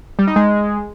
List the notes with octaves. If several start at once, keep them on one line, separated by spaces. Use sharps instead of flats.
G3
D#4
G#3